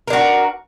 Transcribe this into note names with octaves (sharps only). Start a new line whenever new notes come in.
D4 F#4 A#4